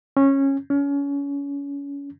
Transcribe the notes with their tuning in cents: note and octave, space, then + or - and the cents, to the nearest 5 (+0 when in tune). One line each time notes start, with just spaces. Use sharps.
C#4 -15
C#4 +30